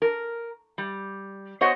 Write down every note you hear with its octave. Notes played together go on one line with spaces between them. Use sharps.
A#4
G3
B3 F#4 C5 C#5 D#5 F#5